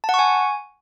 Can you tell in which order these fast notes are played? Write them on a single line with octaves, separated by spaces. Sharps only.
A5 F#5 C#6 G#5